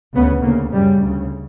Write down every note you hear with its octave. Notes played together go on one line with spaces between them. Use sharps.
D2 C#3 B3
D2 C#3 A#3
F#2 C#3 G3
D2 C#3